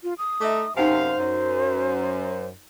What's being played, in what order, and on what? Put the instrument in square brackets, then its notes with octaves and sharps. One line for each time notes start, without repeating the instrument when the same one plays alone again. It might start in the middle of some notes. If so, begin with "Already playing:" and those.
[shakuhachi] F4
D#6
[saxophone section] A3 D#4 [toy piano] E5 D6
[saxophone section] F#2 C3 F5 [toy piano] D#4 F#5 G#5 [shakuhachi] C5
[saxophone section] F#2